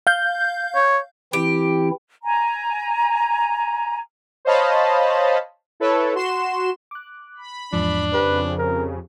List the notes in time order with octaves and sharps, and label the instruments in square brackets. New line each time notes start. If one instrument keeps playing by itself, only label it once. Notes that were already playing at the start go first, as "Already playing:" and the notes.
[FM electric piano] F5 G6
[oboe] C#5
[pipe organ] E3 C4 E4 [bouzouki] G4
[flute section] G#5 A#5
[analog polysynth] C5 C#5 D#5 F5 A5 B5
E4 A4 B4 C#5
F#4 C6 E7
[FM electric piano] D6 F#6
[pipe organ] B5
[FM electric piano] E2 G#2 F3 [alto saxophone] D4
[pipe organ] F2 C#3 [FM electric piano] G4 C5 [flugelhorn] B4
[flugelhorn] A#4